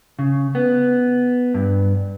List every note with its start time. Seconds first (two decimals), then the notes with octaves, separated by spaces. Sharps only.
0.19 C#3
0.55 B3
1.54 G2